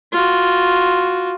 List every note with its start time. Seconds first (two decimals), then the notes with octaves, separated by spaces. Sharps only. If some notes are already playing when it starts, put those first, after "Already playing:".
0.12 F4 F#4